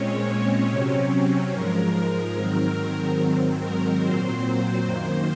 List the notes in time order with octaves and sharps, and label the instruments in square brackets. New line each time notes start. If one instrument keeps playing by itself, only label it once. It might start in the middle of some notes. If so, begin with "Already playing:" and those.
Already playing: [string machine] A#2 G#3 C4 C#4 C#5
C3 F#3 C4
G#2 F3 G#3 A#4
G#2 D#3 F#3 C4
G#2 D#3 F#3 C4
A#4
A#2 F#3 C4 C5
F#2 D#3 A#3